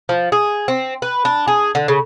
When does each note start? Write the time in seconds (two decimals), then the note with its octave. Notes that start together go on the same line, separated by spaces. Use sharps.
0.09 F3
0.32 G#4
0.68 C4
1.02 B4
1.25 D4
1.48 G#4
1.75 D3
1.88 C#3